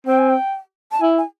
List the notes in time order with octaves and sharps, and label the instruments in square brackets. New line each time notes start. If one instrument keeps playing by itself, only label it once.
[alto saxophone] C4 [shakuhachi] G5
[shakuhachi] G#5
G5
A5
[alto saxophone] E4 [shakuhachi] G#5
[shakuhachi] G#5